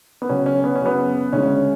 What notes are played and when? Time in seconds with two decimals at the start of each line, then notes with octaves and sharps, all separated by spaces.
0.22 B3
0.29 C#2 C#3 F#3 C#4
0.46 C#4
0.64 B3
0.75 C#4
0.81 F#2 C#3 F#3 B3
1.33 D2 C#3 G#3 C#4